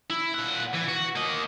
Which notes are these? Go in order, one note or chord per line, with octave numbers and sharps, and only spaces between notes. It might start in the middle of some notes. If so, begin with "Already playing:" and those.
E4
A#2 F#5
E3
F#4
A#3 D#5